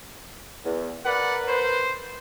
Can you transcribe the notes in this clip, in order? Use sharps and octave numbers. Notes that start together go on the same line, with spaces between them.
E2
A#4 B4 D5 F#5
C5